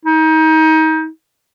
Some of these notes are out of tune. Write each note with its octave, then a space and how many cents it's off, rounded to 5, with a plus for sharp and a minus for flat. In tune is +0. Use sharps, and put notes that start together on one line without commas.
D#4 +30